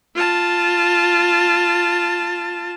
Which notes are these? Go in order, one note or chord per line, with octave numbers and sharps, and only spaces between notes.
F4 A5